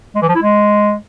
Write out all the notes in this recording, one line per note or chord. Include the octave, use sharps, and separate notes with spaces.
G#3
E3
F3
E4
G#3